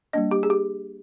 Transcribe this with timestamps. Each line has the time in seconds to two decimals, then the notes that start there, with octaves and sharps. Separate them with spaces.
0.13 G3 A#3 D4 D#5
0.31 G4
0.43 G#4
0.50 G4